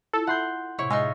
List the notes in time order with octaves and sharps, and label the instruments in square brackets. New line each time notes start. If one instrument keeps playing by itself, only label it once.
[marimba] E4 F4 [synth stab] A4
[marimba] E5 B5 F#6 [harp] F#5 C6 G6
[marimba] A2 C3 [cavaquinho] E4 [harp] C#5
[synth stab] G#3 [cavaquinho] D#4 F4 E5